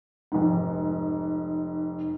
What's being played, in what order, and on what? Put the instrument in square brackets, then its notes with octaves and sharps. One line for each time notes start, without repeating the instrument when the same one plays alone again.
[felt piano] F1 G#2